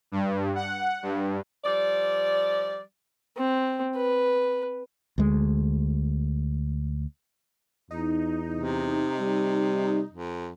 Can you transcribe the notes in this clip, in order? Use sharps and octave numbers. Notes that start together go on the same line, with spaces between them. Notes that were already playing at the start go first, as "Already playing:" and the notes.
G2
F#5
G2
F3 G3 D5
C4
B4
D2 G#3
E2 D#4
C3
G3
F2